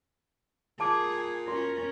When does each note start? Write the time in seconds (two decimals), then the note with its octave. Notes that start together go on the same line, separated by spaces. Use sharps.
0.80 A#2 G#4 A5 D6
1.48 C#4 F#4 A#4